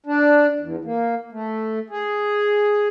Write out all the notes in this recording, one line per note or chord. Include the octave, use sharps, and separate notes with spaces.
D4
E2
A#3
A3
G#4